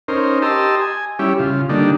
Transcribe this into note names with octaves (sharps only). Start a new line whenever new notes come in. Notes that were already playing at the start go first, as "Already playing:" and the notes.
C#4 D#4 A#4 C5
G4 D#5 A5 A#5 C6 E6
G#5
G3 C#4 E4 G4
C#3 F4
D3 G3 A#3 D4 D#4